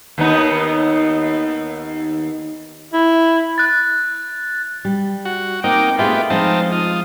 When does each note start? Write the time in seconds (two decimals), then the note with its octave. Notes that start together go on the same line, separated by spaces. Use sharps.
0.18 D#2 B3 D#4
2.93 E4
3.58 F#6 A6
4.85 G3
5.25 F#4
5.64 A#3 C4 D#4 G5 D6
5.99 A3 B3 F4 G4 G#4 E5
6.30 F3 G#3 C4 D#4 F5 A5
6.72 F4 D#6